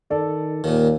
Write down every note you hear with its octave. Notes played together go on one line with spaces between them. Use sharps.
D#3 A4 D5
D#2 A#2 D#3